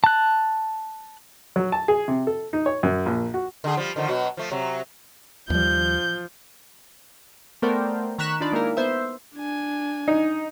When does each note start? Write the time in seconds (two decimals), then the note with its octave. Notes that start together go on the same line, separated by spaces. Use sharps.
0.04 A5 F#6
1.56 F#3
1.72 A5
1.88 G#4
2.08 C3
2.27 A4
2.53 D#4
2.66 C#5
2.83 F#2
3.06 A#1
3.34 F#4
3.64 D3 G#4
3.77 F3 G3
3.96 D3 D#3 F3
4.08 B2 F#3 F#4
4.37 F3 A3
4.51 C3 F#3
5.50 D#2 F3 G3 G6
7.62 A3 B3 A#4 C5 D5 G5
8.18 D#3 A#5 C#6 F#6 B6 E7
8.41 D4 D#4 F4 D5 B5
8.52 G#3 A#3 D#4 E4 A#4
8.77 B3 C5 E5
9.36 D4 G#5
10.08 D#4